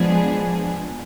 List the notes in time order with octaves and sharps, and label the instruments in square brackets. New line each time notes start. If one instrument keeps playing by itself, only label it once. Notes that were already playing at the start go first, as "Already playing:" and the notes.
Already playing: [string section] F3 G#3 B3 D4 G#4